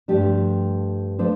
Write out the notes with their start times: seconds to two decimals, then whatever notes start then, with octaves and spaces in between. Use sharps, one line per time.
0.08 G2 F3 A3 D4 G4
1.19 F3 A3 D4 A4 C5